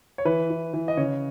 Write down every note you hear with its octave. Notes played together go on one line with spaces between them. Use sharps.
C#5
E3 B4
E3
E3
D#5
C#3 C#5